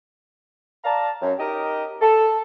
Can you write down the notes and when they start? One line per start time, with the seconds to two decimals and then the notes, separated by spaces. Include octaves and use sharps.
0.84 D5 F5 A5 A#5
1.22 F#2
1.39 D#4 G4 A#4 D#5
2.02 A4